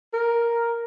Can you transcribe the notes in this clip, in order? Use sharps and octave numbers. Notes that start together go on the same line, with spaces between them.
A#4